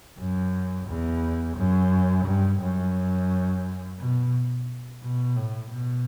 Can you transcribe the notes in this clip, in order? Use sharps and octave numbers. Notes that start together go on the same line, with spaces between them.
F#2
E2
F#2
G2
F#2
B2
B2
A2
B2